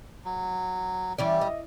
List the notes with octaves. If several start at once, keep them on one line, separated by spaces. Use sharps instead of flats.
F#3
E3 G3 C#4 G4 D5
D#5